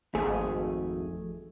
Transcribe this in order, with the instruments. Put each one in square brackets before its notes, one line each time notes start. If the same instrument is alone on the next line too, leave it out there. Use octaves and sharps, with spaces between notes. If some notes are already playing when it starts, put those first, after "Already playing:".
[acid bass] G#1 [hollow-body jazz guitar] F2 A3 G#4